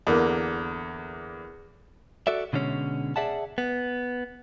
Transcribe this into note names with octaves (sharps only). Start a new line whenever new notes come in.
E2 D3 A#3
F#4 A4 D5 E5
B2 D3 G#3 C#4
G#4 D5 E5 F#5 A5
B3